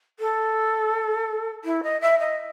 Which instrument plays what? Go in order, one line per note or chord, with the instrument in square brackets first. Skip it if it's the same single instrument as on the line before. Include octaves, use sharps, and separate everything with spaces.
[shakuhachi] A4
E4
D#5
E5
D#5